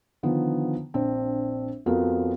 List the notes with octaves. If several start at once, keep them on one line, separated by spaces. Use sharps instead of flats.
D3 D#3 F3 B3
A#1 C4 D4 C5
F2 F3 B3 F#4 A#4 F5